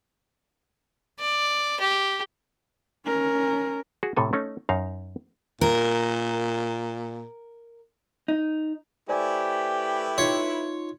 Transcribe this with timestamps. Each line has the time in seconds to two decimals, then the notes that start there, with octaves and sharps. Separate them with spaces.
1.19 D5
1.80 G4
3.06 C#4 A#4
4.03 F#4 G#4
4.17 A2 C3 A4 G#5
4.33 A3 C#4 D#4
4.69 F#2 D#4 F5
5.61 A#2 A#4
8.28 D#4
9.09 A3 E4 G4 B4 C5 D5 G#5
10.18 D#4 F4 C#5 C6